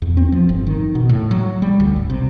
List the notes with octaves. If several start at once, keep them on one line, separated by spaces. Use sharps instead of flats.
E2
C4
F3
G1
D#3
B2
A2
F#3
G3
D2
G#1
C3